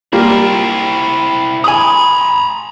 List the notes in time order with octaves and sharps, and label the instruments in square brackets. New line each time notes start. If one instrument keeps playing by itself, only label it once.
[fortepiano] G3 A#3 F4 [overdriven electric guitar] C4 E4
[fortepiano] G#5 D#6 [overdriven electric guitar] A#5 B5